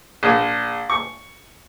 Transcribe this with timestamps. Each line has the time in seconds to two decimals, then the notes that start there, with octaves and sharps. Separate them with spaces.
0.23 A#1
0.90 C#6